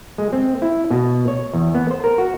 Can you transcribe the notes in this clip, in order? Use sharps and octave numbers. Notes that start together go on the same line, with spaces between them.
G#3
C4
E4
B2
C#5
E2
B3
C5
A#4
F#4